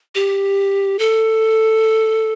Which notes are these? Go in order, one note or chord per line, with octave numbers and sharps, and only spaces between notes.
G4
A4